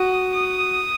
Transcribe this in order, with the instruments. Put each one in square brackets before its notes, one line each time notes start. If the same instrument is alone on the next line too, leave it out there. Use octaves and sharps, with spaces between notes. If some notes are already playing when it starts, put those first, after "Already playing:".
Already playing: [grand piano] F#4 [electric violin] D#6
[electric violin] D#6